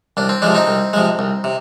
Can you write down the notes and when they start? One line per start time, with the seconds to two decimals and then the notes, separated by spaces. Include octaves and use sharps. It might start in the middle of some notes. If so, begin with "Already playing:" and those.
0.17 C2 D4
0.29 C4
0.42 C3 F3 G#3 D4
0.55 C4 D#4
0.67 C2
0.93 C3 F3 G#3
1.19 C2
1.44 C3